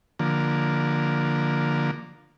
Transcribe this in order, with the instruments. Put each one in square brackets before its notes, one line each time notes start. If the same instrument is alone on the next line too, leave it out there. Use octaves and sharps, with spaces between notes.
[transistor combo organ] D3 F3 A#3